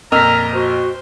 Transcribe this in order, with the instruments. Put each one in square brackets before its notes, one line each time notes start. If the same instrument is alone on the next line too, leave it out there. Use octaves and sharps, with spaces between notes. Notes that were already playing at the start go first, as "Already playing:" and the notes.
[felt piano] F2 A#2 B6 [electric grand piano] A#4 D#5 E6 [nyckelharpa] A#5 [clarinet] F6
[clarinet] F#4 [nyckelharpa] C5